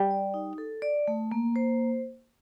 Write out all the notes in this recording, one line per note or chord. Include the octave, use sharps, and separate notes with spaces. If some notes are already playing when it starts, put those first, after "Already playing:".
Already playing: G3
D5
D#4
A4
D5
A3
A#3
C5